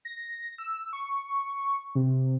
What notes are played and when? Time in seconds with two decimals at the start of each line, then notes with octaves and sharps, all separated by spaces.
0.05 A#6
0.58 E6
0.93 C#6
1.95 C3